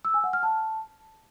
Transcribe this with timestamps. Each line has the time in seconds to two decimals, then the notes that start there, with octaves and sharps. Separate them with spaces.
0.05 E6
0.14 G#5
0.24 F#5
0.33 F6
0.43 A5